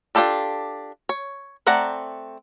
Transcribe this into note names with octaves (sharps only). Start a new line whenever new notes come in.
D4 F4 G4 A4 D5
C#5
A3 C4 D5 F#5 A#5